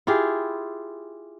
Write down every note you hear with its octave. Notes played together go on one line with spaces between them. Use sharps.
E4 F4 G4 G#4